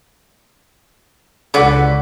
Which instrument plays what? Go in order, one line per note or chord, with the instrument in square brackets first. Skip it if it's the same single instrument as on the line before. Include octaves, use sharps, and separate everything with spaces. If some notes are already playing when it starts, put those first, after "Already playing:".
[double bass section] C#2 [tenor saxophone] D3 [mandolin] F#4 B4 D6